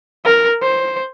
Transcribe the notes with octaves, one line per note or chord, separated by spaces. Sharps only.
A#4
C5